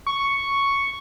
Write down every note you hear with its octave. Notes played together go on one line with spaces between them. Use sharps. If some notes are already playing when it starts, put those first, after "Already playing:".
C#6